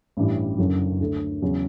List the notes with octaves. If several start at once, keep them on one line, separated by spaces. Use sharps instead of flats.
A1 G2 E3 G3 C#4
F#1 F#2 D3 F#3 C#4
D2 D3 A3
E2 C#3 F#3 C#4 E4